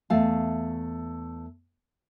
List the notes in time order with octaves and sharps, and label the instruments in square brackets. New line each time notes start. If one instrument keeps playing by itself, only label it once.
[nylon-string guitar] E2 A3 F5 A5